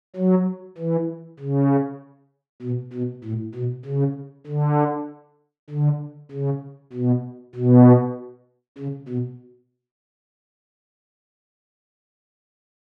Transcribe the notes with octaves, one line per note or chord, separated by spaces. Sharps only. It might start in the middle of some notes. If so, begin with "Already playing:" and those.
F#3
E3
C#3
B2
B2
A2
B2
C#3
D3
D3
C#3
B2
B2
C#3
B2